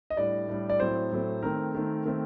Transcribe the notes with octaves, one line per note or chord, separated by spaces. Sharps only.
D#5
A2 G3 D4 D5
A2 G3 D4
D5
A2 F#3 A3 C4 C5
A2 F#3 A3 C4
D#3 A3 C4 A#4
D#3 A3 C4
D#3 A3 C4